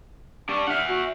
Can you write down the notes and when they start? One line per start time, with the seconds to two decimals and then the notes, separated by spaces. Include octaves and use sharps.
0.49 D4 G4 D5 C#6
0.68 E5 F#5 F6
0.88 F#4